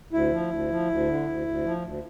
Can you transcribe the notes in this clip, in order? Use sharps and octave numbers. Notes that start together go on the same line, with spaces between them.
D2 E4
F3
D2
F3
D2
D3
D2
D2
F3
D2